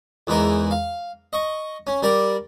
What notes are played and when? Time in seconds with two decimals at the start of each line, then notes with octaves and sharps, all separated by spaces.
0.27 E2 G#2 E3 D#4 A#4
0.71 F5
1.33 D#5 C#6
1.87 C#4
2.02 G3 A#4 D5